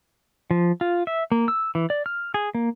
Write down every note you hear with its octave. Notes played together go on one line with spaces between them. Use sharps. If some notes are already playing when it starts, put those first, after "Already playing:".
F3
F4
E5
A#3
E6
E3
D5
F6
G#4
A#3